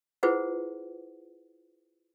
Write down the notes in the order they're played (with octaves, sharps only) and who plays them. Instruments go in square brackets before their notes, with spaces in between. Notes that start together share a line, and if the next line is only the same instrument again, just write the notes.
[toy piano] E4 F4 G#4 B4 C5 F#5